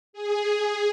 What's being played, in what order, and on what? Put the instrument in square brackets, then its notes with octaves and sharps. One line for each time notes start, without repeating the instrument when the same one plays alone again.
[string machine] G#4